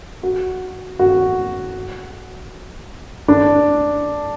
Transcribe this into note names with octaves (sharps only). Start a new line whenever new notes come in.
F#4
F#4
D4